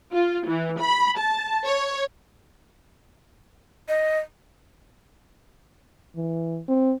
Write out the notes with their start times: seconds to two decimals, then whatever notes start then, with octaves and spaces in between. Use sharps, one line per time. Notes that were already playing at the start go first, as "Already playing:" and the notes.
0.13 F4
0.47 E3
0.81 B5
1.19 A5
1.66 C#5
3.88 D#5
6.16 E3
6.68 C4